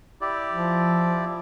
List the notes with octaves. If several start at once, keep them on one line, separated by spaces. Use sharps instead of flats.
E4 G4 D5
F3